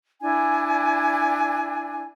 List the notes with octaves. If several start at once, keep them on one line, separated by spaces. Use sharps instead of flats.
D4 E4 G#5